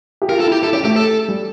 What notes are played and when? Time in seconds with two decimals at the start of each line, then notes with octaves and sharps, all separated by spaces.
0.22 G4
0.29 F4 A#4
0.40 A4
0.46 E4
0.52 G4
0.63 E4 A4
0.73 C#4 G4
0.84 A3 G4
0.96 A4
1.28 G3